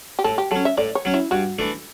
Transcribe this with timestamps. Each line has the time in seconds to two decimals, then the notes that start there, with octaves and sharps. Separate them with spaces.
0.19 G4
0.24 A2 A4
0.38 G4
0.51 F#3 C#4 A4
0.65 E5
0.78 A2 D5
0.95 C#5
1.05 F#3 C#4
1.14 E4
1.31 G2 F#4
1.59 E3 A3 D4